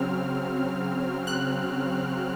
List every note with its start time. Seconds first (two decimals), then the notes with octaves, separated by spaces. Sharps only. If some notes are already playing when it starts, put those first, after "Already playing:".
Already playing: C#3 F#3 C4 F6
1.27 F#6